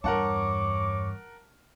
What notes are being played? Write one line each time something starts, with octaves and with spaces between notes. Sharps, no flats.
E2 G2 A#4 C#5 F#5 A5 C#6 D6